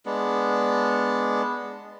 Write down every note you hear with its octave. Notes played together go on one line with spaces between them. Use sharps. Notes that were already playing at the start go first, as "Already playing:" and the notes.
G#3 B3 D4